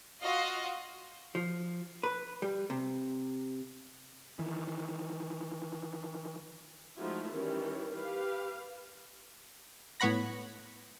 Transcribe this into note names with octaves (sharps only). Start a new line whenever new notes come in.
F4 F#4 D#5 F5
F3
B4
G3
C3
D#3 E3
F3 G#3 A3 D#4 E4 F#4
D#3 E3 G3 C#4
G4 B4 F5
A2 B3 C#5 F#5 B5 A#6